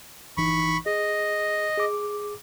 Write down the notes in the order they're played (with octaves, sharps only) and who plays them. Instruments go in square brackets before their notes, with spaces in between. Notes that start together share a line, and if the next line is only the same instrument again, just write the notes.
[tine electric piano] G1 E3 D#4 [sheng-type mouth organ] B5 C#6
[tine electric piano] G#4 [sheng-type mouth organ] D#5
[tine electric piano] G#4 D6